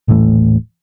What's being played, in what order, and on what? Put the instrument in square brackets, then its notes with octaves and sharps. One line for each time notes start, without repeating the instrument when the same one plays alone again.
[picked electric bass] D#1 A2 E3 A3